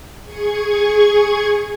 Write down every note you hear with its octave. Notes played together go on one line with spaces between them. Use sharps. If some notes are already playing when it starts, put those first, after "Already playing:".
G#4 C#6 G#6